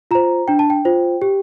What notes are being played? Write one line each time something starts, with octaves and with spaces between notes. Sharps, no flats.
F4 C5 A#5
D4 G5
A5
G5
F4 C5
G4